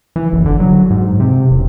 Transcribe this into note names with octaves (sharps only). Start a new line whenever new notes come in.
E3
F#1
D3
F#3
G#2
C3
E1